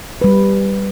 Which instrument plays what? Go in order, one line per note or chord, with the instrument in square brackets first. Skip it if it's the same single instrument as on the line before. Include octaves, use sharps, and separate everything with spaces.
[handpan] G3 B4